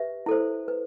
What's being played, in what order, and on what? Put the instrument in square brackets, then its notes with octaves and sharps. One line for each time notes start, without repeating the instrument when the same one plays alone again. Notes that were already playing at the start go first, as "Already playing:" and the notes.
Already playing: [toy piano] G4 B4 E5
E4 A4 C5
B4